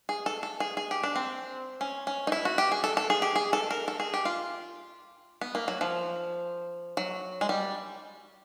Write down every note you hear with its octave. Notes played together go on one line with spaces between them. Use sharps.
G#4
A4
A4
G#4
G#4
G4
D4
C4
C#4
C#4
D#4
E4
F#4
G4
G#4
A4
A4
G#4
G4
G#4
A4
A#4
A4
G#4
G4
F4
B3
A#3
F#3
F3
F#3
G#3
G3